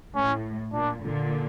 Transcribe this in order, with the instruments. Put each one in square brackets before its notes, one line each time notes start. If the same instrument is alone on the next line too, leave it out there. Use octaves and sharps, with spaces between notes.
[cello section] A2 [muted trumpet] C#4
[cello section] A#2 [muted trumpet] D4
[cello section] A#2 D3